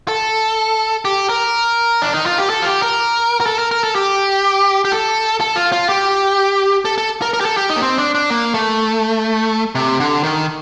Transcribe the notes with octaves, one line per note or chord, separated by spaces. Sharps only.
A4
G4
A#4
D4
D#4
F4
G4
A4
F4
G4
A#4
A#4
A4
A#4
A#4
A4
G4
G4
A4
A4
F4
F4
G4
A4
A4
A#4
A#4
G4
A4
G4
D#4
A#3
C4
D4
D4
A#3
A3
C3
D3
D#3